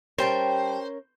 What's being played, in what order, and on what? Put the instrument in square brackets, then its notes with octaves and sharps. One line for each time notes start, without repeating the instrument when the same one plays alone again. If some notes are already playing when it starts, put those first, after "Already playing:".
[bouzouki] G3 G5 A5 [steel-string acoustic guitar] C#4 A#4 C#5 [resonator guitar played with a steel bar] C5